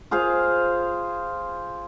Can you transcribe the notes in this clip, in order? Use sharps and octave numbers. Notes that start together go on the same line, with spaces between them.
F4 G#4 C5 F5